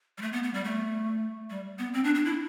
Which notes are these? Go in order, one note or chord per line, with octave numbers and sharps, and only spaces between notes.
G3
A3
B3
B3
G3
A3
G3
B3
C4
D4
D4
E4